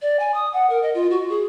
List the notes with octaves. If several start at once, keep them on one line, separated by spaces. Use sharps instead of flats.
D5
G#5
D#6
F#5
A#4
D#5
F4
F#4
G#4